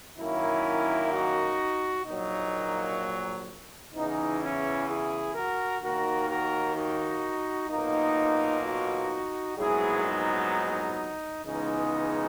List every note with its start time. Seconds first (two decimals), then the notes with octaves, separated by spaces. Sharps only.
0.19 F#2 D#3 A#3 C#4 E4
1.12 D#4 F#4
2.06 A#1 A#2 F#3 A#3 D#4
3.94 E2 C#3 E3 D#4
4.41 C#4 E4
4.88 E4 G#4
5.35 F#4 A#4
5.81 D#2 D#3 A#3 F#4 A#4
6.29 F#4 A#4
6.76 D#4 F#4
7.70 B1 A#2 A#3 D#4
8.63 D#4 F#4
9.57 A#1 G#2 F#3 B3 E4 G#4
10.05 D#4
11.46 C#2 C#3 E3 G#3 B3 D#4